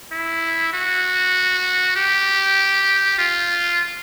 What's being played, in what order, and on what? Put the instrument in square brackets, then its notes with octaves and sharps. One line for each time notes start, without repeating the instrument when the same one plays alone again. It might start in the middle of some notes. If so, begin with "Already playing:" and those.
[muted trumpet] E4
F#4
G4
F4